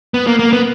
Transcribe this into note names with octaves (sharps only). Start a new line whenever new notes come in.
B3
A#3
A#3
B3